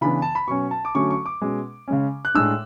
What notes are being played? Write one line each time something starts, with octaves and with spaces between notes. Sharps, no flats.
C#3 E3 B3 D4 B5
A5
B5
B2 F#3 C#4 C#6
A5
D6
D3 F#3 A3 C#4 C#6
C#6
D6
B2 G#3 C#4
C#3 G#3 C#4
F#6
A2 G#3 D4 E6